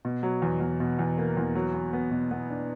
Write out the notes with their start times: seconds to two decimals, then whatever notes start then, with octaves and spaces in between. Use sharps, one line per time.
0.05 B2
0.23 F#3
0.42 E2
0.60 E2
0.80 B2
0.99 E2
1.18 A#3
1.37 E2
1.55 F#3
1.74 B3
1.93 B3
2.11 B2
2.31 B3
2.50 D4